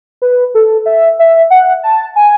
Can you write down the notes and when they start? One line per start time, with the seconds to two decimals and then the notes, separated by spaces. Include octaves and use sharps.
0.22 B4
0.55 A4
0.86 E5
1.19 E5
1.50 F#5
1.83 A5
2.16 G#5